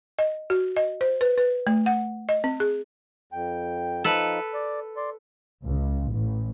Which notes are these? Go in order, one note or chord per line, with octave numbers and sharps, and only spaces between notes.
D#5
F#4
D#5
C5
B4
B4
A3
F#5
D#5
C4
G#4
F2 G5
F3 D#4 A4 B4
D5
D5 C6
C#2
A1